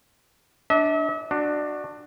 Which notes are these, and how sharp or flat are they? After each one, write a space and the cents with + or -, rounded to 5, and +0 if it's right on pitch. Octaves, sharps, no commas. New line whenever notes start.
D4 +0 E5 -45
D4 +15 F#4 +0